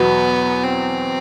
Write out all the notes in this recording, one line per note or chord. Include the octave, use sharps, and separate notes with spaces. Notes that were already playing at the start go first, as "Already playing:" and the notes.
Already playing: E2 B2 F#3 B3
C4